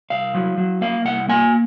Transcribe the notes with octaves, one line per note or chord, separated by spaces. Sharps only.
C2 F5
F#3
F#3
A#3 F5
C2 F#5
A#3 G#5